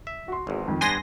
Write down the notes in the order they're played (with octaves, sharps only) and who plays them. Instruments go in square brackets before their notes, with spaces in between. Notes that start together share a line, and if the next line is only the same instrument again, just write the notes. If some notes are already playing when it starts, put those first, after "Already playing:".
[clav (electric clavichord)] E5
[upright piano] F#4 C6
[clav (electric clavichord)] G#1 E2
[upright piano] F2 D#3
[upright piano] G2 [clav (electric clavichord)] B3 D4 G4 [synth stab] G#5 C6 A#6